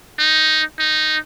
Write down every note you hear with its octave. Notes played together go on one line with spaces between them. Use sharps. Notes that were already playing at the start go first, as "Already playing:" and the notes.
D#4
D#4